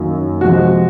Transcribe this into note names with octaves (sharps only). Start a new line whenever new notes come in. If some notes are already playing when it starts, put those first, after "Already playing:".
Already playing: F#2 D#3 F#3 A#3
C3 F3 G#3 F#4